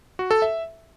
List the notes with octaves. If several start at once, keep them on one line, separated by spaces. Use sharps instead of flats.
F#4
A4
E5